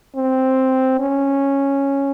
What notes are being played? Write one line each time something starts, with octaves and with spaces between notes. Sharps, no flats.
C4
C#4